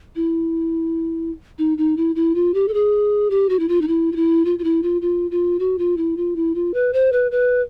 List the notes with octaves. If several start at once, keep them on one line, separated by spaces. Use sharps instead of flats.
E4
D#4
D#4
E4
E4
F4
G4
A4
G#4
G4
F#4
E4
F4
D#4
E4
F4
E4
F4
F4
E4
F4
F4
F4
F#4
F4
E4
F4
E4
F4
B4
C5
B4
B4